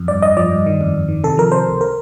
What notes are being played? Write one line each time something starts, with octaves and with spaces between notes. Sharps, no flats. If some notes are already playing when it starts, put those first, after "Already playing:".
Already playing: F2
G2 D5
G2 D#5
F3 D5
G2
D#3
F2
F2
D#3
C3 A4
F3 A#4
C3 C5
C2
A#4